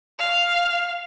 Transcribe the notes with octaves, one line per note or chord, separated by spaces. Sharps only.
F5